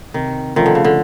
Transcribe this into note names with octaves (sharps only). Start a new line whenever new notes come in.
C3 D#3
D#3 F3 A3 C#4 F4
D3
C#3
D3